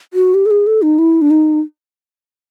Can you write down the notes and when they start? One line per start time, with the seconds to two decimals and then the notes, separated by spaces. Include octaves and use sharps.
0.14 F#4
0.34 G4
0.46 A4
0.51 G#4
0.67 A4
0.82 D#4
0.99 E4
1.22 D4
1.31 D#4